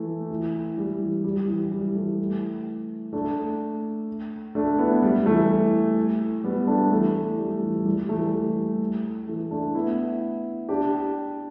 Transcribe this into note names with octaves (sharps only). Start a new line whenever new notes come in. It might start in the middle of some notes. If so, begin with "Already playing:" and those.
Already playing: E3 A3
E3
G3
E3
G3
E3
G3
E3 A3
A3 D4
A3 D4
B3 E4
G3
E3 A3
G3 B3
A3 D4
E3 A3
G3
E3
E3
G3
E3 A3
G3
E3
E3 A3
A3 D4
B3 E4
D4 G4